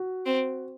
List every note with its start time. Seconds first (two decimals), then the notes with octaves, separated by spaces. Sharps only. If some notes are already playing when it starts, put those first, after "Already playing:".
Already playing: F#4
0.26 C4